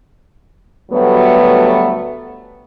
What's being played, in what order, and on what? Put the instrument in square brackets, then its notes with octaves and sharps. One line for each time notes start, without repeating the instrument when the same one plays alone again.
[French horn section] D2 F#3 G3 A3 B3